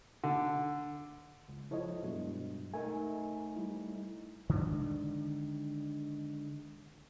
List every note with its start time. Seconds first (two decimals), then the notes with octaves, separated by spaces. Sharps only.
0.24 D3
1.49 C#2
1.71 F3 E4 A4 C#5 D#5
2.03 G2 B2 F#3 G#3
2.74 A3 D#4 A#4 G#5
3.56 G3 E4
4.50 D3 D#3 G#3